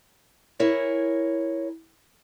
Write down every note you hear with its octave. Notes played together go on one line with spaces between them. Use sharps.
E4 G#4 A#4 C#5